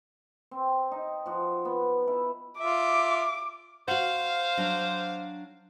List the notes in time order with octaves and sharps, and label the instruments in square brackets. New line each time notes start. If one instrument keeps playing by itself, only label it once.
[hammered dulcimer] C4
D#4
F3 F#4
B3
E4 B4
[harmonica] F4 E5 [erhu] D6
[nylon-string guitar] F#4 F#5 [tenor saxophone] C5 [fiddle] F5
[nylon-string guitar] F#3 D4